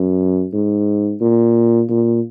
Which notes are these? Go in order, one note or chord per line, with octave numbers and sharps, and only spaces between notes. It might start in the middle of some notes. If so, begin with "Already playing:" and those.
Already playing: F#2
G#2
A#2
A#2